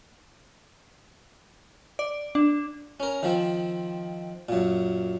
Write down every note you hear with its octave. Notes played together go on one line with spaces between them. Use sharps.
D5
D4
C#4 A#4
D#3 F3 C4
F#2 A#2